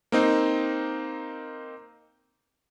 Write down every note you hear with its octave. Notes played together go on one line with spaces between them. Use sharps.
A#3 C4 D#4